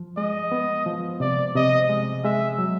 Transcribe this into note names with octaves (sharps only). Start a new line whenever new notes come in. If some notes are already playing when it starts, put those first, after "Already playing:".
Already playing: F3
G#3 D#5
B3
F3
C3 D5
C3 D#5
G#3
G#3 E5
F#3